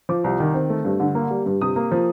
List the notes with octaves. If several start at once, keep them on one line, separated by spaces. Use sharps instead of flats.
F3 D6
C2
D#3
C4
A3
G2
D3
A#3
G3
G2
C3 D#6
A#3
F3